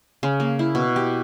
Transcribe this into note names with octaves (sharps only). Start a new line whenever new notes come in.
C#3
A#3
E4
B2
G4